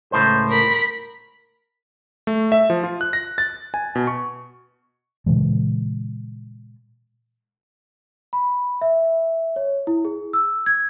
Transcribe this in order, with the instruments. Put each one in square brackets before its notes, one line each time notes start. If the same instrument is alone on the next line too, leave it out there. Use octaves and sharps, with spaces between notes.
[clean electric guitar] C#2 A2 C5
[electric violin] A#4 B5
[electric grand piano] A3
E5
F3
F4
F#6
A#6
A6
G#5
B2
C#6
[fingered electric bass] A#2 C#3 E3 G#3
[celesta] B5
E5
C#5
E4
G#4
E6
G#6